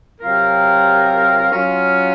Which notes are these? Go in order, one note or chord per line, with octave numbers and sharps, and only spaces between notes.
C3 F#3 C4 F4 A#4
F#3 C#4 F4